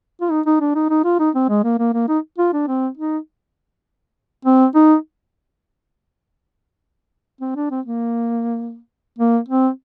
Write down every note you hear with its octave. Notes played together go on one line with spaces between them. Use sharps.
F4
D#4
D#4
D4
D#4
D#4
F4
D#4
C4
G#3
A#3
A#3
A#3
D#4
F4
D4
C4
D#4
C4
D#4
C4
D4
C4
A#3
A#3
C4